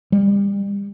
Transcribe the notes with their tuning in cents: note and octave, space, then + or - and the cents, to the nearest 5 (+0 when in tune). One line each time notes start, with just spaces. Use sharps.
G3 +30